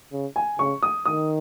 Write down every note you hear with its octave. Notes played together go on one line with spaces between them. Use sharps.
C#3
G#5
C#3 C#6
D#6
D#3 D#6